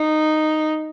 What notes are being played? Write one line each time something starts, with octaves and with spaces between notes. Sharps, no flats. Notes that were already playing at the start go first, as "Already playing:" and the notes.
Already playing: D#4